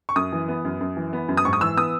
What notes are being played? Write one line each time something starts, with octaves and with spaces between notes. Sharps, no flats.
C#6
F#2 D#6
E3
B3
F#2
F#2
E3
B3
F#2
D#6
G#2 C#6
D#6
E3 E6
B3 D#6